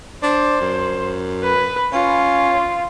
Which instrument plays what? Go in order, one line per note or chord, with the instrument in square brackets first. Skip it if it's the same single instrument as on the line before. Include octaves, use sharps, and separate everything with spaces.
[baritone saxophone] D4 [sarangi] C5
[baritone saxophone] F#2
[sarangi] B4
[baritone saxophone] C#4 [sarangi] F4